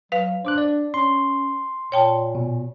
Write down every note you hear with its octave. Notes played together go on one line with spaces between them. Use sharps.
F#3 B4 F5
D4 C5 D6 F#6
D5
C#4 C6
A#2 C#5 G5 A5
B2